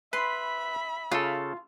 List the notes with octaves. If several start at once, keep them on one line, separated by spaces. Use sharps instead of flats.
B4 E5 B5 C6
C#3 F4 A4